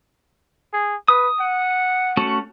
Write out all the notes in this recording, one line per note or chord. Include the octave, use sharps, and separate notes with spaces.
G#4
B4 D#6
F#5
A3 C#4 F#4